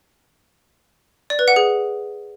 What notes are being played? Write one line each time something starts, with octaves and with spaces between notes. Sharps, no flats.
D5
B4
F#5
G#4